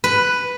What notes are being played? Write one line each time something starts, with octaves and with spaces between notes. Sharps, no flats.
B4